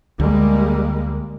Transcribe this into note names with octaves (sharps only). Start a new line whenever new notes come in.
D2 G3 G#3 A#3